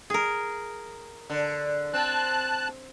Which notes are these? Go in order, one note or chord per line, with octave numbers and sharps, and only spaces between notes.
G#4 A#4
D3
C4 A5 F#6